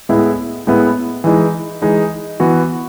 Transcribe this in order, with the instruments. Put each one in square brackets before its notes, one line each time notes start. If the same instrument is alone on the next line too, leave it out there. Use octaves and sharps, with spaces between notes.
[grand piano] A2 G#3 B3 E4
A2 G#3 B3 E4
E3 G#3 D#4
E3 G#3 D#4
E3 B3 F#4